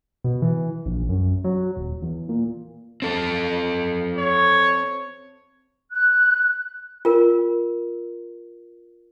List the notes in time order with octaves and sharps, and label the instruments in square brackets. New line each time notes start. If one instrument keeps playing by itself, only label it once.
[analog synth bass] B2
E3
A#1
F#2
F#3
D#1
E2
A#2
[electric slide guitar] C4 A4
[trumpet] C#5
[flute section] F#6
[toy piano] F4 A#4